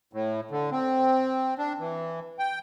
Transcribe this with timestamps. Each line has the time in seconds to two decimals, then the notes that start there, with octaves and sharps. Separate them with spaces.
0.13 A2
0.51 D3
0.72 C4
1.58 D4
1.79 E3
2.39 G5